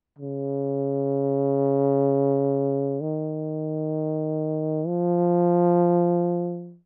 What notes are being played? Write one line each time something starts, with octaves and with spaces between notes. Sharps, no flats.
C#3
D#3
F3